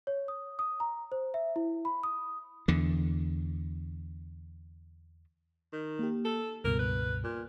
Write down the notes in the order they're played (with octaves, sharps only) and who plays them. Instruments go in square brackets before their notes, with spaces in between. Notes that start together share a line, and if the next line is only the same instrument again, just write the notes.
[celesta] C#5
D#6
D#6
A#5
C5
E5
E4
B5
D#6
[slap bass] E2 D3
[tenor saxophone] D#3
[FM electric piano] A#3 G4
[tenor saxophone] A4
[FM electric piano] C#2 G2 B2 [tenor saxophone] A#4
[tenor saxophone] B4
A#2